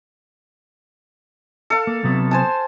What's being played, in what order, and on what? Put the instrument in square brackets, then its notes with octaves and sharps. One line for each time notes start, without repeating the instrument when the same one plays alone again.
[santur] A4 F5
[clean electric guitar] A#3
C3 F#3 B3
[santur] C5 G#5 A5